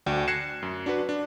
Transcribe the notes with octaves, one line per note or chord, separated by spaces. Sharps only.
D2 D4 F#4 G5
F#6 G#6 A#6 C7 C#7 E7
F#2
D4 F#4 B4
D4